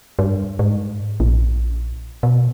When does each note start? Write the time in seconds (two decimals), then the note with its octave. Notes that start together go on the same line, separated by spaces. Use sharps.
0.19 G2
0.59 G#2
1.20 A#1
2.23 B2